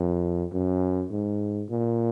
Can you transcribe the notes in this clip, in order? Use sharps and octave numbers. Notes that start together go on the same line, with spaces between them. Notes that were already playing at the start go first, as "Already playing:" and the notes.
Already playing: F2
F#2
G#2
A#2